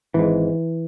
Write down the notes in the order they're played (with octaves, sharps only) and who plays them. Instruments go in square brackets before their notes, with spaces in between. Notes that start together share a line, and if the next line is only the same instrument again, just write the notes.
[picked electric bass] G#1 G#2 E3